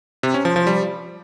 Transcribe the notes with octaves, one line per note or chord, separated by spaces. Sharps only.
C3
C#4
F3
F3
G3